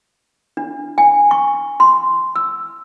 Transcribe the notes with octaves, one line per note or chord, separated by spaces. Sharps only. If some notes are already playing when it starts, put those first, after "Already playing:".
D4
G#5
C#6
C6
E6